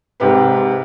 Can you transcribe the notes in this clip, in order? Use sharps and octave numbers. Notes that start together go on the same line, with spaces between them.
G#2 C3 G4 B4